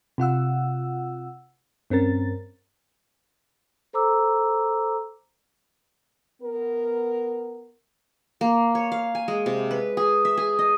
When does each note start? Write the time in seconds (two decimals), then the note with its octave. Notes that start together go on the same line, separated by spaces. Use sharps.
0.18 C3 F4 F#5 E6
1.90 G2 C4 C#4 A#4 A6
3.93 A4 C5 A#5 D6 E6
6.42 B3 A#4
8.41 A#3
8.75 C#5
8.92 F5
9.15 G#5
9.28 G#3
9.46 C3
9.71 B4
9.97 G#4
10.25 E5
10.37 G#4
10.59 D#5